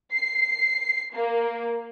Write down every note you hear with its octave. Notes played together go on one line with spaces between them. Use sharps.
C7
A#3